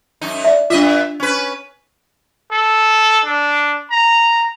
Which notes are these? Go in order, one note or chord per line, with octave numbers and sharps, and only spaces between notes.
F#2 D#4
D5 E5
G2 D4 F4 D#5 E5
C#4 B4
A4
D4
A#5